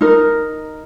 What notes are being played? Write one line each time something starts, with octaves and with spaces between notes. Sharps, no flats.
D#4 A#4